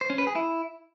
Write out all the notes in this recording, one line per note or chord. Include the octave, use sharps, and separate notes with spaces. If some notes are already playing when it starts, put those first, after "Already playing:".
C5
C#4
B4
G#4
E4